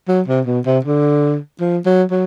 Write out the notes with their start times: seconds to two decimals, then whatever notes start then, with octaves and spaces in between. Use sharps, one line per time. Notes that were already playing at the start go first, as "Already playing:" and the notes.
0.08 F#3
0.28 C3
0.46 B2
0.66 C3
0.85 D3
1.60 F3
1.86 F#3
2.11 F#3